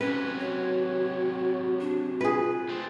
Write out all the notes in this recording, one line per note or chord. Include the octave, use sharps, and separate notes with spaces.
C3 F#3 C#4 B4
F#4 C#5
D4
F4 G#4 B4
A3 C4